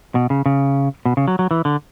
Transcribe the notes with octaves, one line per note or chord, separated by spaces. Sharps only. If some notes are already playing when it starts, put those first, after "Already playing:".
B2
C#3
C#3
B2
C#3
F#3
F#3
E3
D3